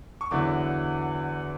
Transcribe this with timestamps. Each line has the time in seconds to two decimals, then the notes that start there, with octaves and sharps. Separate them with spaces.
0.21 C#6
0.31 E2 D3 F#3 B3 E4 D6